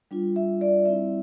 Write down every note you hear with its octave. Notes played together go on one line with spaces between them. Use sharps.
G3 D4 F4
E5
D5
G3 C4 E4 E5